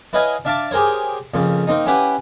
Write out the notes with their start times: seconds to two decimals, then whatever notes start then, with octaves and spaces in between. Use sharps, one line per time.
0.13 E4 B4 C#5 D#5 F5 G#5
0.45 D4 E5 F5 A5 D6
0.71 G4 G#4 A#4 C5 C#5
1.34 F2 C#3 A#3
1.67 A#3 C4 D#4
1.86 C#4 E4 G4 B4 F#5